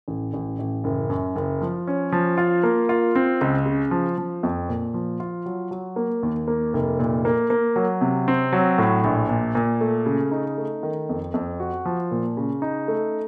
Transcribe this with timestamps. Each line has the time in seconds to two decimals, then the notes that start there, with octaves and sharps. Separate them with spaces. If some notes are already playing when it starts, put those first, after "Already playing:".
0.08 A1
0.34 A1
0.59 A1
0.84 F#1
1.10 F#2
1.36 F#1
1.62 F3
1.87 C#4
2.12 F3
2.38 F4
2.63 A#3
2.89 F4
3.15 C4
3.41 C#2
3.66 C#3
3.91 F3
4.18 F3
4.43 F2
4.69 A#2
4.94 F3
5.20 F4
5.46 F#3
5.71 F#3
5.96 A#3
6.23 D#2
6.48 A#3
6.74 F1
6.99 A#2
7.25 A#3
7.50 A#3
7.76 F#3
8.01 C3
8.28 C4
8.53 F#3
8.78 A2
9.04 A#1
9.29 A#2
9.55 A#2
9.81 A3
10.06 C#3
10.31 D#4
10.58 A3
10.83 D#3
11.09 F2
11.34 F2
11.60 F#4
11.85 F3
12.11 A#2
12.37 C#3
12.62 D#4
12.88 A3